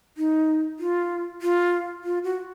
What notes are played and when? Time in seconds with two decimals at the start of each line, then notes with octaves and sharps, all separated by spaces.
0.17 D#4
0.79 F4
1.42 F4
2.04 F4
2.24 F#4